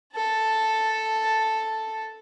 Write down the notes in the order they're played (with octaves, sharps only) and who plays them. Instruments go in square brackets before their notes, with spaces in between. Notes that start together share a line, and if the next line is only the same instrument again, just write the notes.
[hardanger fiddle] A4 A5